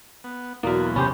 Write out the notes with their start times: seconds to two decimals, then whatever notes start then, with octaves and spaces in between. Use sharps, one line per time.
0.24 B3
0.63 E2 B2 F#3 A#3 E4 F#4
0.96 C3 C#4 G4 C5 B5